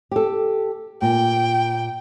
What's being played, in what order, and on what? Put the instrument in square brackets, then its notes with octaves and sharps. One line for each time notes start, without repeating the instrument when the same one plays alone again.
[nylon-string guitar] G4 A4
[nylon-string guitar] A#2 [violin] G5